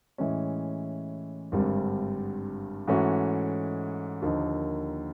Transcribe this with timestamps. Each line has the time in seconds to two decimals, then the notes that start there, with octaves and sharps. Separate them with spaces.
0.18 A2 E3 G#3 C#4
1.52 G#1 G2 D3 G3 C4
2.87 G#2 E3 A3 C#4 F#4
4.22 D#2 D3 F3 A#3 D#4